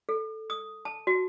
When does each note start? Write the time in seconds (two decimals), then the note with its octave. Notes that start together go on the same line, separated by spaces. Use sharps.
0.09 A4
0.50 D#6
0.85 A5
1.07 F#4